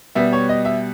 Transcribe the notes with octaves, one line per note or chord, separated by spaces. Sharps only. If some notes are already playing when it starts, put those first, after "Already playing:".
B2 G3 B3 E5
C#5
D#5
E5